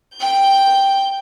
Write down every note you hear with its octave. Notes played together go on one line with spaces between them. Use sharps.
G5 G6